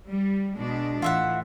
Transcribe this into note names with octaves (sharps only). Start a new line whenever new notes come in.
G3
B2 G#3 D4
A2 E3 F4 E5 F#5